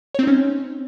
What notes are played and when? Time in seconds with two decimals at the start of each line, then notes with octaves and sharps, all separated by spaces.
0.15 C#5
0.19 C4
0.23 D#4
0.27 C#4